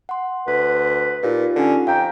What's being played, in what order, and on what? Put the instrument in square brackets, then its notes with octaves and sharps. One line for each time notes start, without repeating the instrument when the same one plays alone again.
[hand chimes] F#5 C6
[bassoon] D2 [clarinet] B4
[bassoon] A#2 [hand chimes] D#4 F4 G4
[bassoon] D3 [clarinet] C#4
[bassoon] F2 [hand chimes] F5 A#5 [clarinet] G5